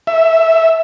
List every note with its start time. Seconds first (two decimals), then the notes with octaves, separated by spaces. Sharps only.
0.07 E5